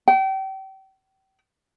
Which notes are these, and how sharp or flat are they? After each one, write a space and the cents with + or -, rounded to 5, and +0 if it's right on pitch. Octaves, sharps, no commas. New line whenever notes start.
G5 -35